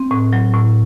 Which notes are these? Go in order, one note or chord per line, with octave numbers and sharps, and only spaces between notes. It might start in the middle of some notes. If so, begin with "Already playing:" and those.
Already playing: C4
A2
F#3
A2